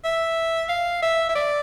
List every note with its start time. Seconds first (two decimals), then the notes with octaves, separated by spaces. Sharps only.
0.04 E5
0.69 F5
1.02 E5
1.29 E5
1.35 D5